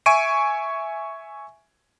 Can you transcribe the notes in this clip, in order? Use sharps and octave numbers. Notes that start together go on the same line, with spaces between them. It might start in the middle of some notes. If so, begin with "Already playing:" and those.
E5 G#5 C#6 D7 D#7